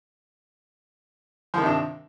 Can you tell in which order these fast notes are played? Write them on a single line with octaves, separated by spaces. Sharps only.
F3 D#3 C3 D4